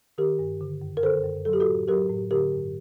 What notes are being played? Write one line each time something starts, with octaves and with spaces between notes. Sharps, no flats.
D#3 G4 A#4
G2
D3
F#2
A#4
D3 A4 C5
F#2
F#3 A4
G4
F#4 A4
A2
F#3 G4 A#4
A2
D3 G4 A#4
G2